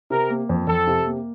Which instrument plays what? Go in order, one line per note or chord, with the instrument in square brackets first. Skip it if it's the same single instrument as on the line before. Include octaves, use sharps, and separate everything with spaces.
[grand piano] C3 [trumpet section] A#4
[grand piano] A#3
F2
[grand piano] F2 [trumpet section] A4
[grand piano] C3
A#3